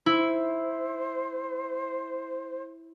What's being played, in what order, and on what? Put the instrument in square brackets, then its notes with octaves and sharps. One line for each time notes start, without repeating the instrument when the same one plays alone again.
[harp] E4 [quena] C5